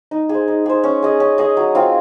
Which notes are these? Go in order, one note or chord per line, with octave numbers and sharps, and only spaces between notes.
D#4
G#4 C5
D#4
G#4 C5
C#4
G#4 D#5
C#4
G#4 D#5
F#3
C4 F4